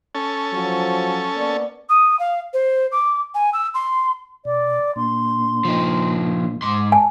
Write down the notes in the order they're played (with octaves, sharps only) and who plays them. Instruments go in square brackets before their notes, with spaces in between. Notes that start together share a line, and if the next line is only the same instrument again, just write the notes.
[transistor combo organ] C#4 A4
[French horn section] F3 F#3
A#3 B3 D5
[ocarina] D#6
F5
C5
D6
G#5
E6
C6
[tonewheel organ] B2 [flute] D5
[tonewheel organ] A#2 A#3 D4 [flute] C6
[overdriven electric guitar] F3 D#4
[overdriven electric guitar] G#2 C6 [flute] D6
[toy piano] G#5 [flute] A5